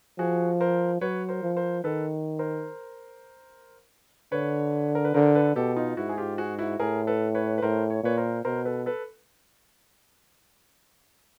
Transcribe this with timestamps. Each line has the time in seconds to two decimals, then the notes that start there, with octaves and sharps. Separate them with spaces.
0.19 F3 F#4 G#4
0.61 A#4 C5
1.01 F#3 B4 C#5
1.29 A#4 C5
1.43 F3
1.57 A#4 C5
1.84 D#3 A4 B4
2.39 A#4 C5
4.32 D3 B4 C#5
4.95 A#4
5.05 B4
5.14 D3 A#4 C5
5.35 A4 B4
5.56 B2 G4 A4
5.76 D#4 F4
5.97 G#2 E4 F#4
6.09 G#4
6.18 F4 G4
6.38 F#4 G#4
6.59 E4 F#4
6.79 A2 G#4 A#4
7.07 A4 B4
7.35 B4 C#5
7.58 B4
7.62 A2 A#4 C5
7.90 C#5
8.03 A#2 B4 C#5
8.18 A#4 C5
8.45 B2 A#4 C5
8.65 A4 B4
8.86 A4 B4